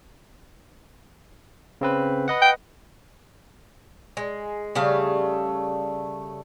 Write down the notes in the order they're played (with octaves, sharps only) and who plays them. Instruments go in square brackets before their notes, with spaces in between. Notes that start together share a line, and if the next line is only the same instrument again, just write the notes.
[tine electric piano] C#3 C4 B4
B4 D#5 F#5
[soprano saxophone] G5
[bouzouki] G#3
C#3 G3 A3 F5